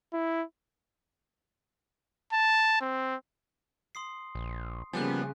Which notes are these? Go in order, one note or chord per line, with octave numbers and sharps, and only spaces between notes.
E4
A5
C4
C6 D#6 C7
A#1
C#3 F3 G3 A#3 B3 G#5 F#6